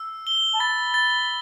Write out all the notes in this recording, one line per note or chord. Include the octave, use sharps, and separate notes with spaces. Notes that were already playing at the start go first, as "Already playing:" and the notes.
Already playing: E6
G7
A5
B5 A6
A6